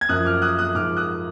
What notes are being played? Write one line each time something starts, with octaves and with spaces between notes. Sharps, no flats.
G#6
F#2 F3 D#6 F#6
D6 F6
D#6 F#6
D#6 F#6
G#2 F3 D6 F6
D#6 F#6